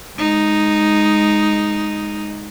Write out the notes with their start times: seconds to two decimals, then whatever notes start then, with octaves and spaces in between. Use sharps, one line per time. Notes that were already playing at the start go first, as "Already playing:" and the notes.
0.16 G#3 D#4